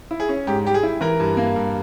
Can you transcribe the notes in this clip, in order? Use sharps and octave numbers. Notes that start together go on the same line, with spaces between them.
E4
G#4
C#4
G#2 G4
G3 G4
G#4
E4
E3 A#4
G2
A#3
G2